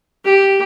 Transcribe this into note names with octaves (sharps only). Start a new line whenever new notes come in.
G4